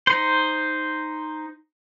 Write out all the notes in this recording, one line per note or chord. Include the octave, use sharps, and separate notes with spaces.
D#4 C5